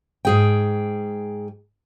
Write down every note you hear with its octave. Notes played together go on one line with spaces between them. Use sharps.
G#2 G#4 G5